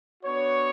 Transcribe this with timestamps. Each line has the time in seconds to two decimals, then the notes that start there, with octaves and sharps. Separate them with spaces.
0.23 B3 D4 F#4 C#5